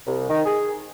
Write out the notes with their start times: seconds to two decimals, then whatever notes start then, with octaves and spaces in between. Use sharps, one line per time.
0.07 C2
0.29 D#3
0.46 G#4